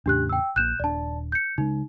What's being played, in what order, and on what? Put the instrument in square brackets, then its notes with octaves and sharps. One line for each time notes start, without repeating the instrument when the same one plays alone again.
[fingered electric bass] E2 A2 C#3 [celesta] D4 G4 F#6
[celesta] G5 E6
[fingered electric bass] A#1 A#2 [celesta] F#6 G6 E7
[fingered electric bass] D#1 D4 [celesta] D5 A5
[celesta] G6 C#7
[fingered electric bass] C#3 G#3 [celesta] D#4